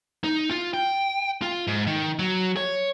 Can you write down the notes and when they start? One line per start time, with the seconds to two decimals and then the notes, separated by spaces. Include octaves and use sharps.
0.24 D#4
0.51 F4
0.74 G5
1.42 F4
1.67 G#2
1.87 D#3
2.19 F#3
2.57 C#5